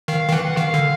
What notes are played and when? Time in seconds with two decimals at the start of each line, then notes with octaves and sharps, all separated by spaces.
0.08 D#3 F5
0.29 D#3
0.32 E3 F#5
0.57 D#3 F5
0.74 D3